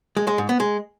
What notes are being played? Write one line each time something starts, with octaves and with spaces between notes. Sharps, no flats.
G#3
G#3
G#2
B3
G#3